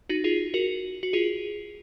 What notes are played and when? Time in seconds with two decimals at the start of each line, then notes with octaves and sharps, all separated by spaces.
0.09 D#4 F#4
0.24 F4 G#4
0.54 F#4 A#4
1.03 F#4
1.13 F4 G#4